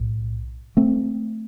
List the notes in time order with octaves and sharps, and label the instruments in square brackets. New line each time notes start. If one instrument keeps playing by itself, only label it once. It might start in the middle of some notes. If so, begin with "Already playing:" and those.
Already playing: [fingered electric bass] B1 A2
A3 C4